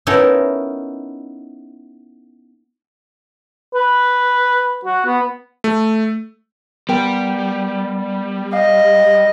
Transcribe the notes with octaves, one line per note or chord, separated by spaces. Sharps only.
B3 C#4 D#4 E4 A4 A#4
B4
F#4
B3
A3
G3 B3 A#4 G5
D#5 F5